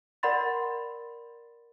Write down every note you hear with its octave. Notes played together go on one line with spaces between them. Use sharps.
A#4 D5 F#5 B5 C6 A6